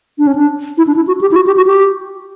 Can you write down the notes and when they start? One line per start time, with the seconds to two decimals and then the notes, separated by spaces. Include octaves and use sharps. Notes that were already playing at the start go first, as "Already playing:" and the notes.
0.18 D4
0.27 C#4
0.35 D4
0.78 E4
0.87 D4
0.96 E4
1.07 F#4
1.21 G4
1.32 E4
1.36 F#4
1.47 G4
1.57 F#4
1.66 G4